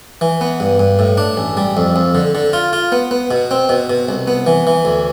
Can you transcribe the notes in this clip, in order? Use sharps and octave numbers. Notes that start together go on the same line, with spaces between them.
E3
B3
G2
G2
A2
D4
A1
G3
F2
F2
D3
D3
F4
F4
B3
B3
B2
C4
B2
B2
C2
B3
E3
E3
D2